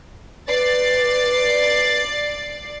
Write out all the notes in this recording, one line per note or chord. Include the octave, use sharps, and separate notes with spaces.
B4 D5 A6 C7